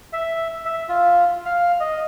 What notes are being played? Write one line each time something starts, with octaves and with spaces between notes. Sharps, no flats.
E5
E5
F4
F5
D#5